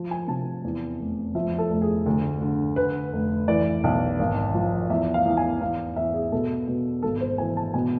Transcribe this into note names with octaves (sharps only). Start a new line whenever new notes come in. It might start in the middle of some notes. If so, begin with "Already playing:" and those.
Already playing: F3
G#5
C3 A5
E2
F1
F3 E5
A4
F1
G#4
D2
D3
D3 B4
F1
E3 D5
B1
G#1
F3
E2 E5
F5
E2
G#5
E2 F5
E2 E5
G#4
B2 A4
B2
G#1 A4
C5
E3 G#5
A5
B2 G#5